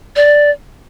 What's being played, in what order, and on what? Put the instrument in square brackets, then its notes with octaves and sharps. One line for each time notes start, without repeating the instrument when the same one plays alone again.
[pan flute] D5